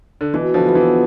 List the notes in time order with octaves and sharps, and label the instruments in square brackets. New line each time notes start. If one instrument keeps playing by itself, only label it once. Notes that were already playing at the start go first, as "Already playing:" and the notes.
[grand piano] D3
[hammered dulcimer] B2 [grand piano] E3
[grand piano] D3 F3
[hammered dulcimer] B3 F4 G#4
[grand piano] E3